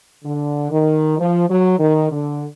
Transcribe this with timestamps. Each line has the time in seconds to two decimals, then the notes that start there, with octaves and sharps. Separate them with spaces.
0.25 D3
0.71 D#3
1.18 F3
1.49 F#3
1.79 D#3
2.11 D3